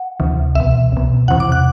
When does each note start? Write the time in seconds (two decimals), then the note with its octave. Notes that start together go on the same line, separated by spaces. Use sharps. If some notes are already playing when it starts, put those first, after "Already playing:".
Already playing: F#5
0.20 D2 C3 E3
0.55 C2 B2 E5
0.92 C2 B2
1.28 E2 C3 E3 F#5
1.40 D6
1.52 F#6